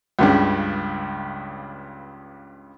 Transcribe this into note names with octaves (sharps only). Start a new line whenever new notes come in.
C#2 G2 C#3